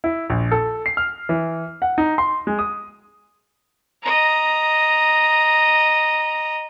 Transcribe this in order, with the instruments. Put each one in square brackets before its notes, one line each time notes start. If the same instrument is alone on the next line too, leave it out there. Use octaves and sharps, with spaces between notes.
[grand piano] E4
A#1
A4
C7
F6
E3
F#5
D#4
C6
G#3
D#6
[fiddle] D#5 A#5